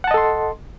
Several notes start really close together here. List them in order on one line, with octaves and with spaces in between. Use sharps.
F#5 A5 D#5 A4 C6